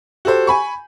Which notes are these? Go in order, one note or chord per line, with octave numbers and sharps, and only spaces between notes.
F#4 G4 A4 C5
G#5 B5 C#6